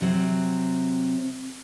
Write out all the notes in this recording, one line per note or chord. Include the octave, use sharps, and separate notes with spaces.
C3 F#3 C4